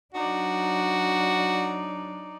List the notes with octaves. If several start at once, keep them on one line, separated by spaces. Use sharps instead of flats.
F#3 D4 D#4 F#4 D5